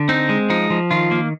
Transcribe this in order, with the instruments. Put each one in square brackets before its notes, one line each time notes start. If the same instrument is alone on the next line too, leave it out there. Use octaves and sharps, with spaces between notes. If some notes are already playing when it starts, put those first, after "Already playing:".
Already playing: [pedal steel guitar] D3
C4 D#4
G#3
F3 D#4
F3
D#3 F4
A#3